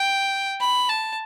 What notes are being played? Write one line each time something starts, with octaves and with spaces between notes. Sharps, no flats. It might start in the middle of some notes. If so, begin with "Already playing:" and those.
Already playing: G5
B5
A5